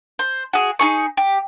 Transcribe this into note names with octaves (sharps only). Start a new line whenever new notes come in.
C5
F#4 G#4
D#4 G#4 C#6
G4